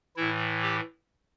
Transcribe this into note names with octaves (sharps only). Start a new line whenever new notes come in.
A2 E3 E4
G4